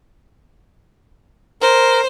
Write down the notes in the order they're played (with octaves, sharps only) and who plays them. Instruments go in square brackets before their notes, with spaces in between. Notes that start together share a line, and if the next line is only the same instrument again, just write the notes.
[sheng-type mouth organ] A#4 [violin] C5